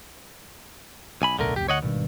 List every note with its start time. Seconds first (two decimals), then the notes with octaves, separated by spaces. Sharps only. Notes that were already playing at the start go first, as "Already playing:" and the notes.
1.22 B1 G#5 B5
1.39 D1 B1 D3 A3 A#4
1.56 F1 C2 G4
1.69 D2 C#5 D#5 F#5
1.82 G#1 G2 B2 D#3